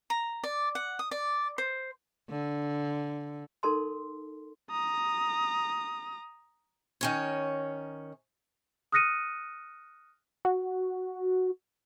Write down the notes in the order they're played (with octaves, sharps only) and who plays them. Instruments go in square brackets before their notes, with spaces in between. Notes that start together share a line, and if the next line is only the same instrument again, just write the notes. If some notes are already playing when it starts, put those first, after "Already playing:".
[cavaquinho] A#5
D5
F#5
D#6
D5
C5
[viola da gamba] D3
[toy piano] D#4 A4 A#4 A5 C6
[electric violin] A#5 D#6
[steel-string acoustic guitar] D#3 C#4 C#5
[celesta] D#6 F6 F#6 A#6 C#7 D#7
[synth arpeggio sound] F#4